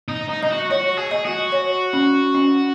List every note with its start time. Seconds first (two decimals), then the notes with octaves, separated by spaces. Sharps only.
0.08 D#4
0.29 D#4
0.43 D#4 D#5
0.50 F#4
0.70 F#4 C#5
0.97 G#4
1.11 D#5
1.25 F#4
1.52 C#5
1.93 C#4
2.34 C#4